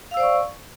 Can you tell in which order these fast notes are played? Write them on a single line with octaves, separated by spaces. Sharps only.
F5 E6 C5 D5 C#6